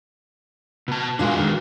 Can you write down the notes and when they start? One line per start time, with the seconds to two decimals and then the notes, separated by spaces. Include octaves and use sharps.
0.88 B2 A5
1.19 A#2 G#3 D4 F#4 G#4 F5
1.37 D2 D#3